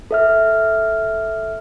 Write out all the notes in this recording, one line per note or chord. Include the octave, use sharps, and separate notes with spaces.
A4 E5 F6